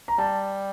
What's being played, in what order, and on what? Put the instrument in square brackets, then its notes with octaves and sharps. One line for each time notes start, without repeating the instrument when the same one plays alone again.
[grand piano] A#5
[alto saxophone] G3 [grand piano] A5